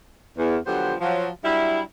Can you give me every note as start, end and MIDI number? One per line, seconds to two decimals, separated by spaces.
0.38 0.58 40
0.66 0.94 50
0.66 0.94 53
0.66 0.94 54
0.66 0.94 59
0.66 0.94 67
0.66 0.94 72
1.00 1.28 53
1.00 1.28 54
1.44 1.81 54
1.44 1.81 55
1.44 1.81 62
1.44 1.81 64